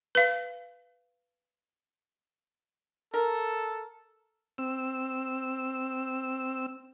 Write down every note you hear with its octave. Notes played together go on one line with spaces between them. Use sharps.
B4 F5
A4 A#4
C4 E6